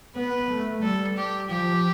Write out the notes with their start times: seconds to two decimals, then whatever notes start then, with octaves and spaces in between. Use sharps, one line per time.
0.15 B3 B4
0.49 A3
0.82 G3 A4
1.16 G4
1.50 F3 G4